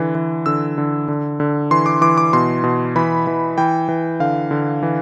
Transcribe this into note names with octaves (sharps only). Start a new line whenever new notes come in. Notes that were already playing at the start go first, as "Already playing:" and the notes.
Already playing: D3 E3
E3
D3 E6
D3
D3
D3
E3 C6
D6
E3 D6
D6
B2 C6
B2
E3 B5
E3
E3 G5
E3
D3 F5
D3
E3